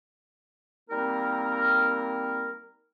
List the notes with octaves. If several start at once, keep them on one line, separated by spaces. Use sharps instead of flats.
G3 A#3 C4 D#4 A#4